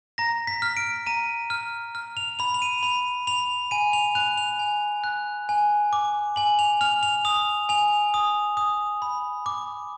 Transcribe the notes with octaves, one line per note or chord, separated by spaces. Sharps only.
A#5 A#6
B6
F6
D7
A#5 D#7
F6
F6
F7
B5 F7
F7
D#7
B5 F7
B5 F7
G#5 D#7
F7
F#6 F7
F7
G#5
F#6
G#5
D6
G#5 F#7
F7
F6 F7
F7
D#6 F7
G#5 F7
D#6
D#6
B5
D6